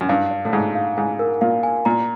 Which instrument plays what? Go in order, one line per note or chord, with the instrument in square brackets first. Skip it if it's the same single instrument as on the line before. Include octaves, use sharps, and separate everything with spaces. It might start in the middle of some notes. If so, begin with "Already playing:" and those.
[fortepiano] F#2
[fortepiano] G2 [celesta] F5
[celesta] D5
[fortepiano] A2
[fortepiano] G#2 [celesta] D5
[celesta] F5
[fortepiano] G#2 [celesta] G#5
[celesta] A#4
[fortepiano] A#2 [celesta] F5
[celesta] G#5
[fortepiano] A#2 [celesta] A#5